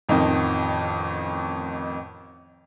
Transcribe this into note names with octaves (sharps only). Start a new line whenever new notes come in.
A1 F2 D#3 F3 D#4